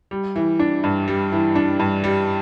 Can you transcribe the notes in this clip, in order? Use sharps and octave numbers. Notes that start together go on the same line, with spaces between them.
G3
E3
D4
G2
G3
E3
D4
G2
G3